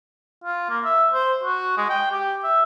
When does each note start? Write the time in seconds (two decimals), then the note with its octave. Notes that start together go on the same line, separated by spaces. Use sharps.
0.44 F4
0.70 A#3
0.85 E5
1.13 C5
1.44 F#4
1.77 G#3
1.90 G5
2.12 G4
2.44 E5